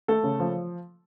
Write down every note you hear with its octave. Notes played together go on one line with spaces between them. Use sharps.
A3 A4
C#3
F3